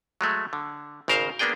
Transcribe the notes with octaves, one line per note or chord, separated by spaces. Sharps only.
F#3 G#3 A3
D3
G#1 C#3 A#4 C5 F5
A#3 B3 D4 G#4 G5